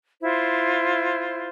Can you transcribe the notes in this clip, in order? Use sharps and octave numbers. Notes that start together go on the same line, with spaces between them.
E4 F4 C5